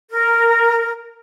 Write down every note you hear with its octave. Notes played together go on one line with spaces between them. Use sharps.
A#4